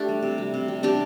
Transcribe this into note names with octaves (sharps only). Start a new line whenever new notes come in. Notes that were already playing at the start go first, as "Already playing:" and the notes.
Already playing: A3 D4 G4
G3
C3
G3
C3
G3
C3 D4 G4